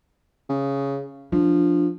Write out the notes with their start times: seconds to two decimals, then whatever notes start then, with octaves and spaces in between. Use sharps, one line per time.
0.49 C#3
1.32 F3 D4